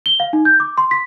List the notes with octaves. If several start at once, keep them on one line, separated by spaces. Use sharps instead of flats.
G7
F5
D#4
G6
D6
C6
B6